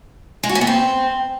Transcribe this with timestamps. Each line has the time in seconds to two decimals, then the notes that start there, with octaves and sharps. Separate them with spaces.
0.43 G#3
0.49 F#4
0.55 C#4
0.61 B3
0.67 C4